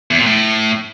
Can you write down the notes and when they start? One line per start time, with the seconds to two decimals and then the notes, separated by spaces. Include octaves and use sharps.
0.11 E2
0.18 A#2
0.26 A2